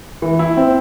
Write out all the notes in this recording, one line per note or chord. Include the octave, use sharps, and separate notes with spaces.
E3
E4
C4